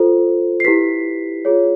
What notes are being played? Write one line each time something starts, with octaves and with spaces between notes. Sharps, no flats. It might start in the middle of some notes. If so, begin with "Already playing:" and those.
Already playing: F4 A4 C5
C7
E4 G4 B4 B6
F4 G#4 C#5